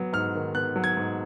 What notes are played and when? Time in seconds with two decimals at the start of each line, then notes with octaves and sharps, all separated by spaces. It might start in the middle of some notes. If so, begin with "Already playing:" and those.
Already playing: F#3 B3
0.13 G#2 F6
0.35 D#3
0.55 B3 F#6
0.76 F#3
0.84 G#6
0.97 G#2